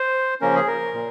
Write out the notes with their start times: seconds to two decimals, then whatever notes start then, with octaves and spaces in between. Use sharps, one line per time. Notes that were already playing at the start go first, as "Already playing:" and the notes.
Already playing: C5
0.41 C#3 F3 A#3 C#4 A#4
0.55 G#4
0.67 A#4
0.94 A#2